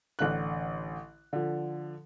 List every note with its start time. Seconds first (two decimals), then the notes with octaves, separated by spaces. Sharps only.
0.19 A1 D3 F#6
1.33 D3 F3